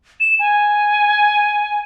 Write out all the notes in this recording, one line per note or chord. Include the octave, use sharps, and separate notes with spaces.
E7
G#5